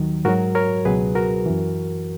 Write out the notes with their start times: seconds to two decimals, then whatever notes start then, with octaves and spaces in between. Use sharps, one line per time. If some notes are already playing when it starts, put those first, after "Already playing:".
Already playing: D#2 D#3 F#3
0.25 G#2 F#3 F#4 A#4
0.55 A#4 C#5
0.85 C#2 B2 F#3 G#4 B4
1.15 F#4 A#4
1.46 F#2 E3